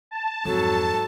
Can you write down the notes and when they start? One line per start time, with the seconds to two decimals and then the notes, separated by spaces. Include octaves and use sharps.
0.11 A5
0.45 F2 G#2 F#3 A4